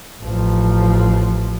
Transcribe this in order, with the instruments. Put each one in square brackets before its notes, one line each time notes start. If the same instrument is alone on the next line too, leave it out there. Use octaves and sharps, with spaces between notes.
[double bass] A1 F3